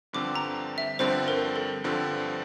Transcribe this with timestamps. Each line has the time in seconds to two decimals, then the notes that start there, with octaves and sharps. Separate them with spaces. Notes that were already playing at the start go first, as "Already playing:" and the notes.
0.13 G2 D3 F3 C4 D6
0.36 A#5
0.78 E5
0.99 G2 D3 F3 C4 C5
1.28 A#4
1.56 A4
1.84 G2 D3 F3 C4